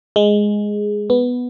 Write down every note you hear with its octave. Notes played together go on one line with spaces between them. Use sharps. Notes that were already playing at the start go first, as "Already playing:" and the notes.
G#3
B3